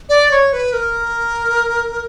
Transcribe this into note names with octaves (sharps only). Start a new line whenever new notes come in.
D5
C#5
B4
A#4